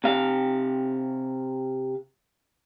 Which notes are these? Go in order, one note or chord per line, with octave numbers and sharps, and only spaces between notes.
C3 F5